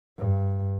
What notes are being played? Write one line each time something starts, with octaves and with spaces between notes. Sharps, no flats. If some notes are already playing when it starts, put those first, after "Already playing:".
G2